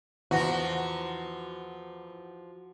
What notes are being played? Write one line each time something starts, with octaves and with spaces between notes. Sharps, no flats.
E2 F3 F#4